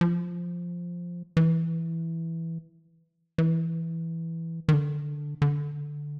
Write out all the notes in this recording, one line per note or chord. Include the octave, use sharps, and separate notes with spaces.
F3
E3
E3
D#3
D3
D3